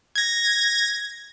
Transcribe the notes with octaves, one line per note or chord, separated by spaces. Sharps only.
G#6 A#6